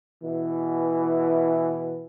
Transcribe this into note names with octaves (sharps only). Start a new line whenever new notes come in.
B2 E3